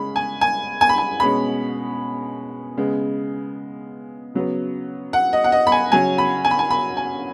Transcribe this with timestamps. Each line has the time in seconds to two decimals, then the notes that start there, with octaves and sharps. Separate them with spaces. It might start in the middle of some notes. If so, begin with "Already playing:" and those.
Already playing: C#3 G#3 C#4 B5
0.16 G#5
0.41 G#5
0.81 G#5
0.89 B5
0.98 G#5
1.20 B2 G#3 C#4 B5
2.77 C#3 G#3 B3
4.34 C#3 F#3 B3
5.13 F#5
5.33 D#5
5.44 F#5
5.52 D#5
5.67 B5
5.72 G#5
5.92 C#3 F#3 C#4 G#5
6.18 B5
6.45 G#5
6.51 B5
6.59 G#5
6.71 B5
6.97 G#5